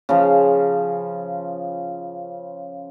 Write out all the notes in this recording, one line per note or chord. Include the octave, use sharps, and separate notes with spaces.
C#3 F3